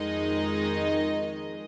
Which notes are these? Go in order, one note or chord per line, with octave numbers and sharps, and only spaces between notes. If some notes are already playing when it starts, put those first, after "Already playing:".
Already playing: F2 D#3 G#3 D#4 D#5